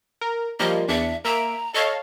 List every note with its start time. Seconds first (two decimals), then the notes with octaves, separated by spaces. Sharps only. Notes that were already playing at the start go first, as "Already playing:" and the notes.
0.21 A#4
0.60 F3 G3 A#3 D#5
0.88 E2 D4 E5 C#7
1.25 A#3 E5 A#5 D7
1.74 A4 C#5 D#5 F5